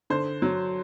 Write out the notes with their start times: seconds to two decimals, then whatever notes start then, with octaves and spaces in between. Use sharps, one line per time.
0.10 D3 C5
0.42 F#3